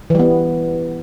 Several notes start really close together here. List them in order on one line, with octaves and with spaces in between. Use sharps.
E3 G3 B3